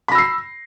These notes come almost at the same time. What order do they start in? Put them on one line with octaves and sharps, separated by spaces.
B5 A#6 E6 C7